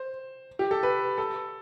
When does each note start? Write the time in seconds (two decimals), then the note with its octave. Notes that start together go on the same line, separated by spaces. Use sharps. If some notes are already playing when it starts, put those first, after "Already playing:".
Already playing: C5
0.59 G4
0.71 A4
0.83 B4
1.18 A4